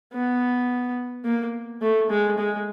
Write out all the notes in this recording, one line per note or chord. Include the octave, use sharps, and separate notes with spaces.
B3
A#3
A3
G#3
G#3